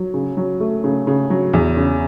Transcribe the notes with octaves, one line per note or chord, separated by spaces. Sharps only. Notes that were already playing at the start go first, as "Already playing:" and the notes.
Already playing: F#3
C#3
F#3
A3
C#3
C#3
F#3
E2
C#3